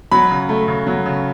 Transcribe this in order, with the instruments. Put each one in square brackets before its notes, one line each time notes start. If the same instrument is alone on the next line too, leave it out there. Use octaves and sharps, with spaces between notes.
[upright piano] F#3 [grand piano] B5
[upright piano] C#3
A3
C#3
F#3
C#3